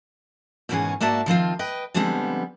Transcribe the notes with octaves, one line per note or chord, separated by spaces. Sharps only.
G#2 B2 D#3 E3 C#4 G#4
G#2 A#3 F#4 D5 E5 A5
D#3 F3 C4 F4
B4 D#5 G5
D3 F3 G3 G#3 B3 C4